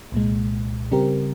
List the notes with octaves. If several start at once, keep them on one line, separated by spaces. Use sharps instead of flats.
C2 A#2 G#3
C#3 G3 C4 G4 A#4